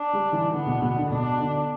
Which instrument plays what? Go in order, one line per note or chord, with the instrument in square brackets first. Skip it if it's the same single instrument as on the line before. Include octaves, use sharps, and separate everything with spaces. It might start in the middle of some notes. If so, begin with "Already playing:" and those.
Already playing: [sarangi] D4
[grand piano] G3
E3
[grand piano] D3 [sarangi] B3
[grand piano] B2
D3
B2
D3
[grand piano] B2 [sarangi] D4
[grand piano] D3